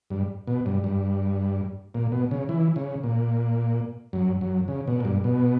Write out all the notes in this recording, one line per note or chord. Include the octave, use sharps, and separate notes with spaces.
G2
B2
G2
G2
A#2
B2
C#3
E3
C#3
A#2
F#2
F#2
C#3
B2
A#2
G2
B2